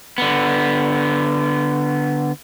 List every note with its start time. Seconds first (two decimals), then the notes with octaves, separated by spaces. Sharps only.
0.18 D3 B3